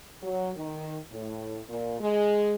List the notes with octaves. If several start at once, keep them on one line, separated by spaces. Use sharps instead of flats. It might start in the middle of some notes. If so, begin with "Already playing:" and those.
F#3
D#3
A2
A#2
G#3